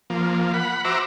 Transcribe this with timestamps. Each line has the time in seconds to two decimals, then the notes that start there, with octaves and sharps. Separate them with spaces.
0.10 F3 A#3
0.53 F#5 B5
0.85 F#4 C5 E5 A#5 D6